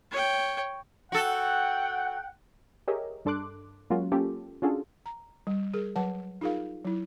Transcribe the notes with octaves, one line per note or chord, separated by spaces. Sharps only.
C#5 G5
F#4 A4 F#5 G5
G4 G#4 A#4 C#5 D#5 E5
G2 D4 A4 C6 D6 F#6
F#3 G#3 A#3 C#4 F4 F#4
A#3 C#4 F4 G4 A4
C#4 D4 F4 F#4 G#4 A4
A#5
G3
G#4 A#4
F#3 B4 F#5 A5
D#4 F4 G#4 A#4 F5
F#3 E4